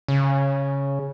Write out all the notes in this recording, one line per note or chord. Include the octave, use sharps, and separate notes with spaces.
C#3